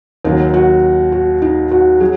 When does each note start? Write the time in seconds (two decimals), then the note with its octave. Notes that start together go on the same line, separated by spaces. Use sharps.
0.25 D#2 D#3 F#3 D#4
0.54 F#4
1.12 F#4
1.42 D#4
1.71 F#4
2.00 F#3 G#4